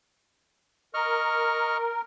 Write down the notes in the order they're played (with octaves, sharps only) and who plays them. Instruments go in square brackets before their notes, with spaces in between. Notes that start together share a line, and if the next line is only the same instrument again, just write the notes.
[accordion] A#4 [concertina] D#5 C#6 F6